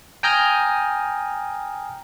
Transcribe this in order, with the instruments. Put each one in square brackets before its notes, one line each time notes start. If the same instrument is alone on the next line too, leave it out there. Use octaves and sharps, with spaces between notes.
[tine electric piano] G5 G#5 A#5 D#6 F6 G6